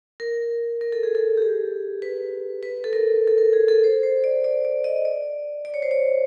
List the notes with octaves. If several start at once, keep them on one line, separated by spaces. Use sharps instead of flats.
A#4
A#4
A4
G#4
A4
G4
G#4
B4
B4
A4
A#4
A4
A#4
G#4
A4
C5
C5
D5
D5
D5
D#5
D5
D5
C#5
C5
C#5